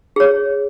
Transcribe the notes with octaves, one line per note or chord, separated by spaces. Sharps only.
G#4 C#5